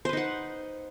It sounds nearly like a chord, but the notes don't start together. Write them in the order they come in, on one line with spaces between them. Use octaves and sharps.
C5 B4 D#4 F#5